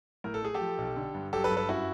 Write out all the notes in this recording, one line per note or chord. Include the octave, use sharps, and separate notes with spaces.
A2 A#4
A4
A3 G#4
G4 A4
F3
B1
D3
G2
F#3 G4 A4
A4 B4
G2
A4 B4
F#2 E4 F#4